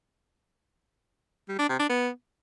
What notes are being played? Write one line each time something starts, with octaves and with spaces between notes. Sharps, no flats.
G3
D4
C3
D4
B3